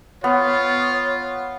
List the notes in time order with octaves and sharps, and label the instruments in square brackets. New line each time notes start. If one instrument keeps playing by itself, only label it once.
[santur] B3 [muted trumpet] F4 [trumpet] C#5